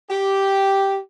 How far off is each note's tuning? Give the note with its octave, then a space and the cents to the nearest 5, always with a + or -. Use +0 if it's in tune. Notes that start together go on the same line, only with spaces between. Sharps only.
G4 -5